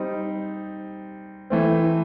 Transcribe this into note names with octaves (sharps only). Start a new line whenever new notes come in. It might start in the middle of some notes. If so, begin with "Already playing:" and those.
Already playing: G3 C4 D#4
E3 A3 C4